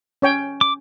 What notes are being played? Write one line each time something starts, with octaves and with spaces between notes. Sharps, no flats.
C#4 C#5 G5
D6